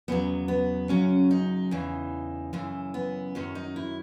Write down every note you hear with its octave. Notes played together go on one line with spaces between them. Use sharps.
E2 C#3 F#3 B3
B3
F#2 C#3 F#3 C#4
D#4
E2 C#3 E3
F#2 C#3 E3
B3
F#2 D#3 F#3 C#4
D#4
E4